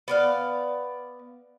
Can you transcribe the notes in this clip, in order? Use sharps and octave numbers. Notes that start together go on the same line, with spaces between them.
B3 D5 F5